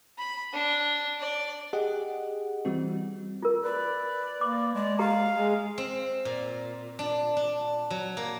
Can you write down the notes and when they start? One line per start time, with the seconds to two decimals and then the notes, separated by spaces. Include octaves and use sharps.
0.18 B5
0.53 D4
1.19 D5
1.73 G4 G#4 D#5 F#5
2.65 E3 G3 C4 F#4
3.42 F4 A#4
3.63 B4 D5
4.41 A#3 D6
4.75 G#3 D5
4.99 G4 F5 A#5
5.36 G#3
5.78 C4
6.25 A#2
6.99 D4
7.37 D4
7.90 F#3
8.17 A#3